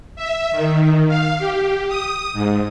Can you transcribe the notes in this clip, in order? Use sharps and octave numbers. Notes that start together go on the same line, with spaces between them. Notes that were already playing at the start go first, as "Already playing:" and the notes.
E5
D#3
F5
G4
D#6
G#2